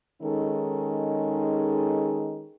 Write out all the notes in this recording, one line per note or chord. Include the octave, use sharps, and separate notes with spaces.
D#3 G#3 C#4 D#4 G#4 A4